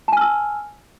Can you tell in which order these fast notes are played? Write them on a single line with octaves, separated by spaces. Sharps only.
A5 G#5 F6 E6